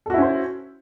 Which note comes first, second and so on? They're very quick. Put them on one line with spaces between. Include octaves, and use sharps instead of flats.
A4 F#4 E4 C#4 C5